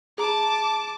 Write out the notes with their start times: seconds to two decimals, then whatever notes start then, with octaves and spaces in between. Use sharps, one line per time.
0.18 G#4 A5 A#5 D6